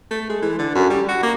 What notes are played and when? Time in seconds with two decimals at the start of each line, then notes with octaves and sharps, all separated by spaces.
0.11 A3
0.29 G#3
0.42 E3
0.59 D3
0.75 F#2
0.90 G3
1.09 F#4
1.23 A#3